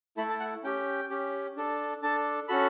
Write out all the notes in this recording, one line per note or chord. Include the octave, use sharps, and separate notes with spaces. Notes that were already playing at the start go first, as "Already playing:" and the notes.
A3 E4 A4 B5
A5
F#5
C#4 G4 G5
C#4 G4
D4 A4
D4 A4 A5
C#4 F#4 A4 B5